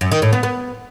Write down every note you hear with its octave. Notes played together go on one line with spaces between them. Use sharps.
F#2
D#3
A2
B3
B3